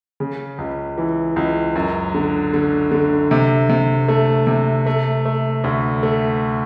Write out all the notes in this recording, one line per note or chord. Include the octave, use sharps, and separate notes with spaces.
C#3
C#2
E3
C#2
F#2
D3
D3
D3
C3
C3
A3
C3
A3
A3
D2
A3